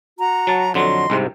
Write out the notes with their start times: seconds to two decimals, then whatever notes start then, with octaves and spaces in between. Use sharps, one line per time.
0.18 F#4 A#5
0.47 F#3 A5
0.74 F2 D3 F#3 D#5 C6
1.10 C2 G#2 C3